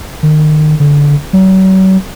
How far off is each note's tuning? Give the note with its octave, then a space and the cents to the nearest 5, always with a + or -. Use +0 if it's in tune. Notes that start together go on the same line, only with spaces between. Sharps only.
D#3 -30
D3 -20
F#3 +40